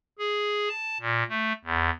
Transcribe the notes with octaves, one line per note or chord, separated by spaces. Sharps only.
G#4
A5
A#2
A3
E2